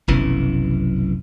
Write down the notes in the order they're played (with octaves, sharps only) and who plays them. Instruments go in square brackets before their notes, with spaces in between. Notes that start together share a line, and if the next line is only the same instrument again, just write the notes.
[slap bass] F1 B1 F#2 E3